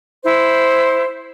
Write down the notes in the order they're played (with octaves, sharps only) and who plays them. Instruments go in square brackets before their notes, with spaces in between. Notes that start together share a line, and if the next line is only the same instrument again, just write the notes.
[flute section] E4 C5